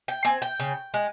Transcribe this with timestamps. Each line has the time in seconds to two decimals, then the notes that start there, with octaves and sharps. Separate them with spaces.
0.08 G5
0.25 C4 G#5
0.42 G5
0.60 C#3
0.94 G#3